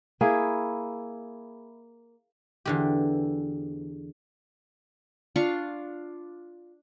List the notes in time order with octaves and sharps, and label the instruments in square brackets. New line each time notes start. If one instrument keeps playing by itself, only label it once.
[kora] A#3 E4 G#4
[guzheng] E2 D3 G4
[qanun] D4 F4 F5 C#6